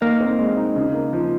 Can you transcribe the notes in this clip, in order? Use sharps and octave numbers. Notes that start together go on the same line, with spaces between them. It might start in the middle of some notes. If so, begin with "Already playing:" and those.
A#3 D#4
C4
G#3
D#4
C#3
A#3
F3